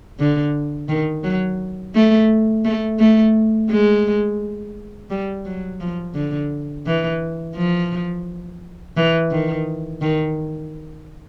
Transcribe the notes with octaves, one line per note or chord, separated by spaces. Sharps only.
D3
D#3
F#3
A3
A3
A3
G#3
G3
F#3
F3
D3
E3
F3
E3
D#3
D#3